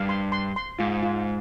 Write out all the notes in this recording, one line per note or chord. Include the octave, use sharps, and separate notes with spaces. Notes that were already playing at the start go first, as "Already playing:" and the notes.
Already playing: G2 F5
C6
C6
C6
G#2 F4
F4